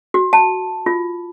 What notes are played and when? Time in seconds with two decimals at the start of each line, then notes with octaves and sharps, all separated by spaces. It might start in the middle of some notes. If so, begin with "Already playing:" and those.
0.14 F#4
0.33 A5
0.86 F4